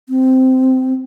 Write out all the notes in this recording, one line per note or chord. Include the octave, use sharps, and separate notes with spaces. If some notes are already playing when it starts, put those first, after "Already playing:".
C4